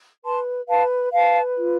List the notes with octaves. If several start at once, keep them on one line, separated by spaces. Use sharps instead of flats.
B4 A5 C6
B4 F5 A5
B4 F5 A5
F4